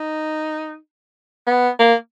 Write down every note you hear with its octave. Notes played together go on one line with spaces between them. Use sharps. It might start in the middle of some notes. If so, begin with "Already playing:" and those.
Already playing: D#4
B3
A#3